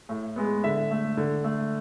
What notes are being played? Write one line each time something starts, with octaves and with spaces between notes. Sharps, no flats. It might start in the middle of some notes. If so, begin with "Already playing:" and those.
A2
G#3 B3
D3 E5
A3
D3
A3